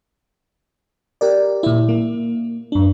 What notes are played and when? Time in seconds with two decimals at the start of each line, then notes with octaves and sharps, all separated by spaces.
1.21 G4 A#4 D5
1.63 A#2 E4
1.89 A#3
2.72 F#2 D4